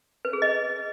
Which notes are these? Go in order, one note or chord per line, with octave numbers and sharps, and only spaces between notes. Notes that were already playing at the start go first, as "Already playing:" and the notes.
B4
G#4
D#5